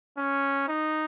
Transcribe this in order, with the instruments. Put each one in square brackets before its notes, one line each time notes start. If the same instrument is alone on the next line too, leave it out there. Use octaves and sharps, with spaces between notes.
[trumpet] C#4
D#4